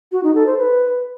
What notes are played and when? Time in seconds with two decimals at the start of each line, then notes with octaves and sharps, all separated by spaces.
0.12 F#4
0.23 D#4
0.35 A4
0.46 C5
0.58 B4